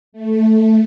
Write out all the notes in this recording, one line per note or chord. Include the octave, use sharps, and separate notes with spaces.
A3
A3